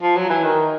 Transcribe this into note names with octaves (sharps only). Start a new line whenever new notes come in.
F3
F#3
E3
D#3